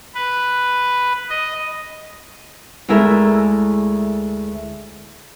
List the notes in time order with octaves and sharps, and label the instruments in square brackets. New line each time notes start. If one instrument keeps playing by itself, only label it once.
[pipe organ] B4
D#5
[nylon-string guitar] D2 G#3 A3 E4 A#4 E5